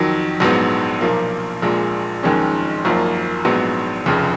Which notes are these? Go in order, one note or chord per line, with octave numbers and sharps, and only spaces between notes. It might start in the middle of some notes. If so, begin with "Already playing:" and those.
Already playing: F2 D#3 F#3
A#1 G#2 F#3 B3
B1 A#2 F3 A#3
A#1 A#2 G#3
F#1 F2 D#3 G#3 C#4
G#1 F#2 F3 A#3
A#1 G#2 F#3 B3
F1 F2 C#3